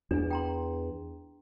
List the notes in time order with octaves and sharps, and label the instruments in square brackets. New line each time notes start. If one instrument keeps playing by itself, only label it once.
[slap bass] E2 [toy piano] D4 G#5
[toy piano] G5 A#5 C6